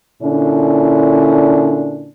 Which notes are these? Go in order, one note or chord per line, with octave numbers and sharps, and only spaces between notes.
A#2 D3 C#4 D4 E4